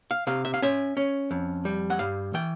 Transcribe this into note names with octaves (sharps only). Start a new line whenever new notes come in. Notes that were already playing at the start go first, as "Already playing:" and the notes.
F5
C3 F5
E5
F5
C#4 E5
C#4
F2
G3
F#5
G2 F5
E3 G5